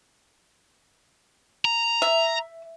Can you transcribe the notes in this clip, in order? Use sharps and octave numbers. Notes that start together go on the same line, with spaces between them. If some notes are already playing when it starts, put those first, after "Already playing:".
A#5
E5